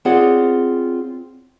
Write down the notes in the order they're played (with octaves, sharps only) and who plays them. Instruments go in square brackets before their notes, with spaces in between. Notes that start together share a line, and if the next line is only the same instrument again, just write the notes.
[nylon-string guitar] C4 F4 G#4 C#5 D5 F#5